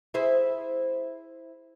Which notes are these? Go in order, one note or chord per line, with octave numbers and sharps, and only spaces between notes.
E4 G#4 C5